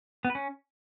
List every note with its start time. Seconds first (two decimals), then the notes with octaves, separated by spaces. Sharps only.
0.25 B3
0.30 B4
0.35 C#4